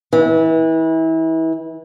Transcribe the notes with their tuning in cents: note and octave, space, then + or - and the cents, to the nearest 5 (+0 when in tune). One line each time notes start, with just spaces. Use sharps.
E3 -30